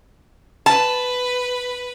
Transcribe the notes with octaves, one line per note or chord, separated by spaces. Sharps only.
B4 A5